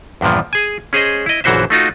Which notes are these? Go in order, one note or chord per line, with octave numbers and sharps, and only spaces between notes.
E2 G2 A#2 F3
G#4 G#5
C#4 G#4 C5 D#5
E4 D#5
A#1 F#2 E3 F#4 C5 E5
A3 D#4 F4 F#4